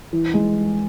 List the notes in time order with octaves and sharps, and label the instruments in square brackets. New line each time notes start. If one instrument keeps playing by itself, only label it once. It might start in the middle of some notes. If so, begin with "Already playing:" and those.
[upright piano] E3
G#3